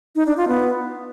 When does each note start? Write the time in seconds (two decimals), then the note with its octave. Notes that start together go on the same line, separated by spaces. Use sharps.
0.16 D#4
0.26 D4
0.37 F4
0.48 B3